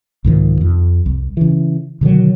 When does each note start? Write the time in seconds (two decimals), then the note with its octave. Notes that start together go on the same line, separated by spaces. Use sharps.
0.24 C2 G#2 D#3 F3
0.61 F2
1.06 C2
1.37 C#3 E3
2.01 B2 D3 D#3 F#3